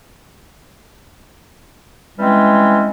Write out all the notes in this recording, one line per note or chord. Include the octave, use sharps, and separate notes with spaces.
E3 G3 G#3 C4 C#4